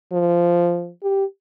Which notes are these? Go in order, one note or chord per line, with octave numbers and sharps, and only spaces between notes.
F3
G4